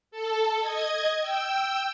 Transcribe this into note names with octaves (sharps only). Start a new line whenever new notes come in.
A4
D#5 G#6
G5 E6